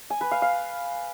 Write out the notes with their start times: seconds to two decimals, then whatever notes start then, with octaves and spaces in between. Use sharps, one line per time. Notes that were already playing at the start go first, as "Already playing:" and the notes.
0.10 G#5
0.21 B4
0.31 F5
0.42 F5